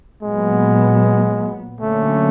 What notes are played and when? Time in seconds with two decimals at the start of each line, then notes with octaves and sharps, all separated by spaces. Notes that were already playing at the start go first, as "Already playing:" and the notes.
0.22 A#2 F#3 G#3 B3
1.80 D3 F#3 A3 A#3 C#4